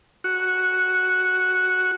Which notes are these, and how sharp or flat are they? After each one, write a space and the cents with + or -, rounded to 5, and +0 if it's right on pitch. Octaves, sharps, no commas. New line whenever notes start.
F#4 -5